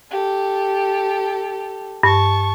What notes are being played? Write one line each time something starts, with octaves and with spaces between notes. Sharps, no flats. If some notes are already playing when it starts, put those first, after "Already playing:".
G4 A4
G2 A5 C#6